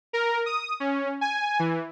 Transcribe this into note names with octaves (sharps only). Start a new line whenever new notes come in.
A#4
D#6
C#4
G#5
E3